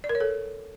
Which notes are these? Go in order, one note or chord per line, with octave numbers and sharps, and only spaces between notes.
D5
A#4
C#5
A4